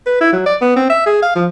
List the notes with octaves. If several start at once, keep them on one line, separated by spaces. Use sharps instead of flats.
B4
E4
F#3
D5
B3
C4
E5
G#4
F5
F3